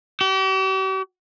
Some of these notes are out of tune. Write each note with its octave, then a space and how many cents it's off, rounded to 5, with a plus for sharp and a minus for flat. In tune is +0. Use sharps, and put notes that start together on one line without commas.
G4 -45